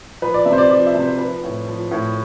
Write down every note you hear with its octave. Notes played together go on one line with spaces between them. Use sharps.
F3 B4
D5
C3 E5
C5
D5
F3 D5
E5
C3
C5
F3 B4
A2
F3
A2